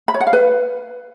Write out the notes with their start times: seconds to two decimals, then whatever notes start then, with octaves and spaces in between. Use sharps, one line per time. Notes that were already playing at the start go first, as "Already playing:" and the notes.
0.08 B5
0.14 C#5
0.21 F#5
0.27 F5
0.33 B4